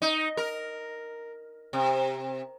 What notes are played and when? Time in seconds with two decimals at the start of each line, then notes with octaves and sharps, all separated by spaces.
0.02 D#4
0.37 A#4
1.73 C3